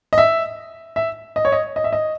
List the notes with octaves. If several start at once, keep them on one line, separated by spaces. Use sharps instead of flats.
D#5
E5
E5
D#5
C#5
D#5
D#5
E5
D#5